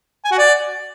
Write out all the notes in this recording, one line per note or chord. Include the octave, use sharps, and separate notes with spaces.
G#5
F#4
D5